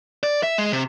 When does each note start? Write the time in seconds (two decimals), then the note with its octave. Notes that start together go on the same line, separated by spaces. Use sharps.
0.23 D5
0.43 E5
0.58 G#3
0.73 C3